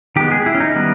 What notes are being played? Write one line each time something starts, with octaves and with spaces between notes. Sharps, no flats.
D#3 G#3 B3 G4
G#4
E4
C#4
D#4
D#3 G3 B3